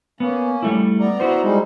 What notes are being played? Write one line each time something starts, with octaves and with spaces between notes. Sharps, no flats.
A#3 B3 C#4
G3 A3 E4
B3 D5 A#5
E4 F#4 C5
G3 G#3 D#4